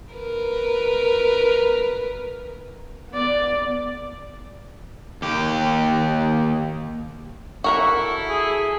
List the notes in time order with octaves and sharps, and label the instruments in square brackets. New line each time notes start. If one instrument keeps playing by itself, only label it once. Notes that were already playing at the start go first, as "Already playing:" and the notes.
[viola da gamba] A#4 B4
[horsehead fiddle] B3 D5
[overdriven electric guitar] D#2 G4
[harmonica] E4 A4 [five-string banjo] F#4 A#4 F#5
[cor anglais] G#4